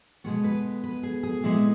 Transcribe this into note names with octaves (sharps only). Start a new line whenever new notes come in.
B2 G#3 B3 C#5
B4
B4
G#4
G#4
A#2 G#3 B3 E4